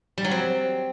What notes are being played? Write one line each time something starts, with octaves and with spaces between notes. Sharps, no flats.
G3
F#3
C4